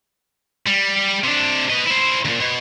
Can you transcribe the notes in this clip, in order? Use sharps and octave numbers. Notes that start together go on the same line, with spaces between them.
G3
C3 D4
B4 D#5
E4 C5
D2 A#2
B2